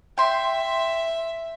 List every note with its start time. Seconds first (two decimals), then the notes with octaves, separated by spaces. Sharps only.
0.18 E5 G5 C6